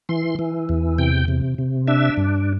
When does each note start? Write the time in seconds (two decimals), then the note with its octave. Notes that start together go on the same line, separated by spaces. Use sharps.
0.09 E3 C6
0.39 E3
0.69 E2
0.98 C3 G5
1.28 C3
1.58 C3
1.87 D4 E5
2.17 G2